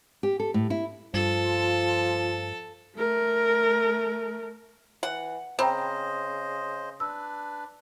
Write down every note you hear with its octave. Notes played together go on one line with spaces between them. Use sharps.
G4
A4
A2
E4
G2 F3 F4 A4
A3 A#4
E3 F#5
C#3 C4 C5 D#5 G5 A#5 B5
D4 B4 E6